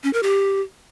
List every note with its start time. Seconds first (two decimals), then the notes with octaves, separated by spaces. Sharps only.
0.03 C#4
0.13 A#4
0.23 G4